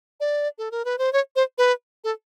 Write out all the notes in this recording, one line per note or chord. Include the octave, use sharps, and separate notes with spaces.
D5
A4
A#4
B4
C5
C#5
C5
B4
A4